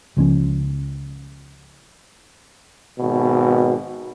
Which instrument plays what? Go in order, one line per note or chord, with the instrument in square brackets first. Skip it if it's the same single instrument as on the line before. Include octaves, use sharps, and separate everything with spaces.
[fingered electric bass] C#2 F3 G#3 C#4
[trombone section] G#1 B2